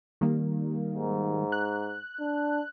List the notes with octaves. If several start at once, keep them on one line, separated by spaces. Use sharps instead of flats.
D#3 G3 A#3
G#2
F#6
D4